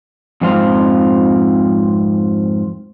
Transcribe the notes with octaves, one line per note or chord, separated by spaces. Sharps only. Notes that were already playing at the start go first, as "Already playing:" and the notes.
F2 G#2 C4 F4